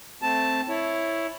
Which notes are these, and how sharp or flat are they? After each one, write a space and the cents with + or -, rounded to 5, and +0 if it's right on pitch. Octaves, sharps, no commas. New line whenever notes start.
A3 +0 C4 +0 A5 +0
E4 +0 C#5 +0